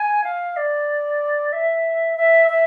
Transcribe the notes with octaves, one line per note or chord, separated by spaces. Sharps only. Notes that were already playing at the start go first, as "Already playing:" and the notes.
Already playing: G#5
F5
D5
E5
E5
E5